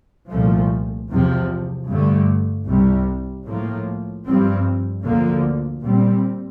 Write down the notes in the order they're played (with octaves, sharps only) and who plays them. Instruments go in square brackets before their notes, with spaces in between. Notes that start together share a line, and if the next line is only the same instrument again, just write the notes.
[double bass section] C2 A#2 F3 A3
E2 C3 F3
G2 D3 A3
C2 C3 G3
A2 F3 A#3
G2 F3 C4
D2 D3 F3 A#3
A#2 G3 C4